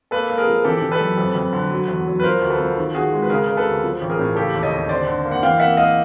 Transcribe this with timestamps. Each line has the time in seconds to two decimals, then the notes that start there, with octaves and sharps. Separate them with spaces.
0.11 A#3 A4 B4
0.30 A#3
0.38 G#4 A#4
0.47 F3
0.64 E3 G4 A4
0.82 E3
0.92 A4 B4
1.01 F#2
1.18 F2
1.35 F2
1.53 D3
1.71 F#3
1.88 E2
2.07 F#3
2.20 B4
2.24 F3 A#4 C5
2.42 D2
2.50 A4 B4
2.60 F3
2.77 D#3
2.95 D#3 F#4 G#4
3.12 G#3
3.22 B4
3.30 C#3 G#4 A#4
3.46 C#3 A#4
3.57 A4 B4
3.66 D2
3.84 F3
4.01 A1
4.10 G#4 A#4
4.19 A2
4.36 C#3 G4 A4
4.54 D#2
4.63 C#5 D#5
4.72 D#2
4.89 D3 C5 D5
5.07 D3
5.24 A#3
5.31 F#5
5.43 E3 F5 G5
5.60 A#3 E5 F#5
5.77 A#3 D#5 F5